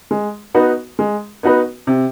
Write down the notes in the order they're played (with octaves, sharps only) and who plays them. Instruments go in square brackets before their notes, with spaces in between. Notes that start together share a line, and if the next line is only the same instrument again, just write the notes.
[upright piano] G#3
B3 D#4 F#4 B4
G#3
B3 D#4 F#4 B4
C3